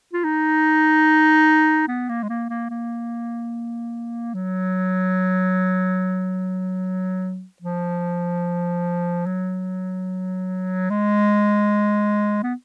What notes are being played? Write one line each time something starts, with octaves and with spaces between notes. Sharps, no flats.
F4
D#4
B3
A#3
G#3
A#3
A#3
A#3
F#3
F3
F#3
G#3
B3